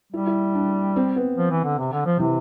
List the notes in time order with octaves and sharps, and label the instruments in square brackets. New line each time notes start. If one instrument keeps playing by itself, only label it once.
[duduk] G3 [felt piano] E4
[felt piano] E4
D4
C4
B3
[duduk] F3
E3
D3
C3
D3
F3
[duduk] C3 [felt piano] E3